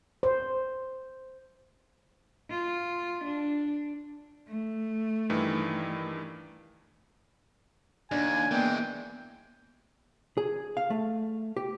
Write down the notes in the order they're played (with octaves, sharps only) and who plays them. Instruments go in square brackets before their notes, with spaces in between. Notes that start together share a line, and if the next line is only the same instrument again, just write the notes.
[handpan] C5
[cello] F4
D4
A3
[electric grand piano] G2 D#3 E3
[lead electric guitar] D#2 [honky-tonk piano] D4 [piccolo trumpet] G#5
[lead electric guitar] E3 G#3 [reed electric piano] A#3 B3 [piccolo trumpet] G5
[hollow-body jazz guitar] G#4
F5
A3
G4